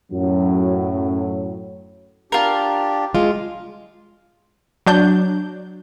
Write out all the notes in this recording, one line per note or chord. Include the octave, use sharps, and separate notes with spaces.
F#2 A2 F#3
D4 F4 G4 A#4
G#3 F4
F#3 D4 G6